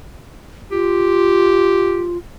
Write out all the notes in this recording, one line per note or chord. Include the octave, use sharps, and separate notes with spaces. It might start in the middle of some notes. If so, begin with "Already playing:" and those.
F4 G4